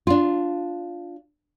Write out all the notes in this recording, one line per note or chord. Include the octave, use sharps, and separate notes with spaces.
D4 F4